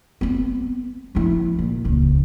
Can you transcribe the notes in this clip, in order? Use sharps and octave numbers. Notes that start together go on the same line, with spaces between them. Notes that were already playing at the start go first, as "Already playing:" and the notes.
B3 C4
F3 E4
A#2
D#1 C#2